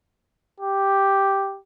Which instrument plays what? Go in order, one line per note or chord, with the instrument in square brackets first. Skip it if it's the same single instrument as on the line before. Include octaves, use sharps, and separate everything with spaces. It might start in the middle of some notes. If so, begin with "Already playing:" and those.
[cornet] G4